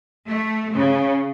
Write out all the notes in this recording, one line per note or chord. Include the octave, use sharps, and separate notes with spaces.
A3
C#3